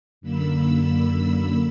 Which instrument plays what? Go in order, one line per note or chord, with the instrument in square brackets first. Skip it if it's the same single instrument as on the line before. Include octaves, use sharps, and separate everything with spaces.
[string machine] F#2 D3 A#3 B5 E6